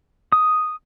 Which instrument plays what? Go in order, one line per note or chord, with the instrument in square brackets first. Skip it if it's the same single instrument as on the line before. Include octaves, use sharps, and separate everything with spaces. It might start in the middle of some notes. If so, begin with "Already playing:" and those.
[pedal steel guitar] D#6